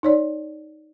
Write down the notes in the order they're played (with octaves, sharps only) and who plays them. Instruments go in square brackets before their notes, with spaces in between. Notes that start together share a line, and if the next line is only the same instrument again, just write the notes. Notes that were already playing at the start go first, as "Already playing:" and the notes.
[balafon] D#4 C#5 D5